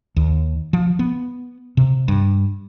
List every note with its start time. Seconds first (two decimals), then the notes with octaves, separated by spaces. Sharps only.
0.16 D#2
0.73 F3
0.99 B3
1.77 C3
2.08 G2